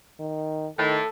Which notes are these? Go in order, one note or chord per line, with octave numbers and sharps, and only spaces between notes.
D#3
A2 D#3 A4